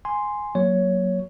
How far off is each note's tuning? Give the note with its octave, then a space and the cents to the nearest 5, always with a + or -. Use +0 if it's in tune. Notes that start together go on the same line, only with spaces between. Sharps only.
G#5 +0 C6 +0
F#3 +0 A#3 +0 C#5 +10